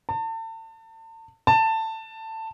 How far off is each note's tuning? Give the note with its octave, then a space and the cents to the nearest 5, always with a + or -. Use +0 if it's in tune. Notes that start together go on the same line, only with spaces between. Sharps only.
A5 +35
A5 +15